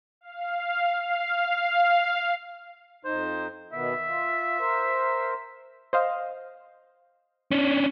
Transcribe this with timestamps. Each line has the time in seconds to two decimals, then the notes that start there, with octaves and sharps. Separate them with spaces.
0.21 F5
1.05 F5
3.05 F2 D#4 C5
3.73 B2 D#3 B3 E5
4.07 F4
4.59 A#4 C5
5.93 C5 D#5 F5
7.51 C#4 D4